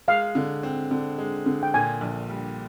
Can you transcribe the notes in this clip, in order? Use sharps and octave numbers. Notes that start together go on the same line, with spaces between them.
G#3 F5
D3
C4
D3
G#3
D3
G5
A#2 G#5
A#1
G3